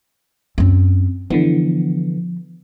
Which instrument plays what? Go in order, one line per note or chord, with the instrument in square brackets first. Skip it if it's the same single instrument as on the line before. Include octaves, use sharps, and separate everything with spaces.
[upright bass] F#2 C4
[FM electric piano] D3 E3 B3 [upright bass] F3